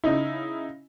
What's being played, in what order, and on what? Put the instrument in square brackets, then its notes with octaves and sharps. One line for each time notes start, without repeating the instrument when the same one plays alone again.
[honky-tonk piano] C#3 D#4 E4